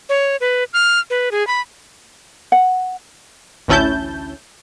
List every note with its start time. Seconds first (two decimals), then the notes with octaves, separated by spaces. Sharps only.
0.09 C#5
0.41 B4
0.73 F6
1.10 B4
1.32 G#4
1.47 B5
2.52 F#5
3.68 A1 D2 C#4 E4 A5 G6